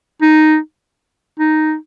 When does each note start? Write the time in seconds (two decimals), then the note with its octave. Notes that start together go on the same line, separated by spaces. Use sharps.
0.22 D#4
1.40 D#4